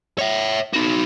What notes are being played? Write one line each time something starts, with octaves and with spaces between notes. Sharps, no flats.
C#5 E5
D#4 F#4